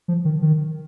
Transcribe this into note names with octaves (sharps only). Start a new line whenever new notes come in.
F3
D#3
D#3